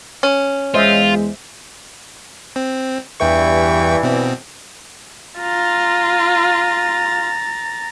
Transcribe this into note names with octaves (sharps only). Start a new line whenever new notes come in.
C#4
E2 G#3 F4 C5 D#5 E5
C4
E2 G2 E3 G5 C#6
B2 C4
F4 A#5 A6